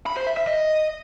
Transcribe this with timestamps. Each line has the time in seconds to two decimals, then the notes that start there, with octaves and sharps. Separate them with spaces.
0.06 B5
0.17 C5
0.27 E5
0.37 E5
0.47 D#5